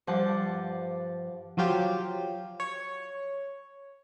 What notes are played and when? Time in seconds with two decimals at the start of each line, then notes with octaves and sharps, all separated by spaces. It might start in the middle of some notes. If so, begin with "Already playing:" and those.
0.07 G2 F3 C5 D5 F#5 A5
1.57 F3 F#3 F4 G4
2.60 C#5